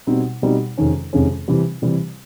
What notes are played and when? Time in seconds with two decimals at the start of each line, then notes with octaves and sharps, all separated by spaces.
0.07 B2 G3 C4 D#4
0.42 B2 G3 C4 D#4
0.78 F2 C3 D#3 G#3 C#4
1.13 F2 C3 D#3 G#3 C#4
1.48 C3 E3 G3 C4
1.82 C3 E3 G3 C4